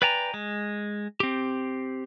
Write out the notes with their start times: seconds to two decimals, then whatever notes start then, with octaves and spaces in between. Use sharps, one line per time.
0.02 B4 D5 G5 G#5 A#5
0.34 G#3
1.20 C4 G4